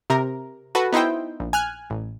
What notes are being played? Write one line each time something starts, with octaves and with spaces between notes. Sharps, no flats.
C3 A#4
F#4 A4 B4
B3 D#4 E4 C5 G5
A#1
G#5 F6 F#6
A1